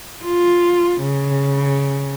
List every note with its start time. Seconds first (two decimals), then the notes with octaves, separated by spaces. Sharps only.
0.24 F4
1.02 C#3